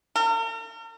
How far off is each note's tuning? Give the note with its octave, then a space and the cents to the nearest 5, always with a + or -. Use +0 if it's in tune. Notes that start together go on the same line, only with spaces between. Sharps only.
A#4 -45